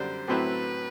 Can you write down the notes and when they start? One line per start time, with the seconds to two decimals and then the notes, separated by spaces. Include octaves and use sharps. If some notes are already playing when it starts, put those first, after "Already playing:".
Already playing: F#2 D3 G3 D4 C5
0.28 A2 F#3 C4 E4 B4